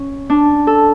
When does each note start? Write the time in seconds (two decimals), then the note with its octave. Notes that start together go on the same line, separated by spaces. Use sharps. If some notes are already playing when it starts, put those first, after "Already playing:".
Already playing: C#4
0.30 D4
0.67 A4